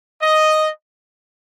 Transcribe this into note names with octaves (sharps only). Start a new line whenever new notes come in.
D#5